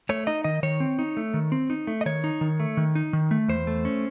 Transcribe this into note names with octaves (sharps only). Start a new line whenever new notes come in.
A3 C#5
D#4 D#5
D#3 D#5
D#3 C#5
C4
D#4
A3
D#3
C4
D#4
A3
D#5
D#3 C#5
D#4
D#3
A3
D#3
D#4
D#3
A3
E2 C5
A3
C#4